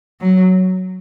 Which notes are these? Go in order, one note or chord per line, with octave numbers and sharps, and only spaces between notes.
F#3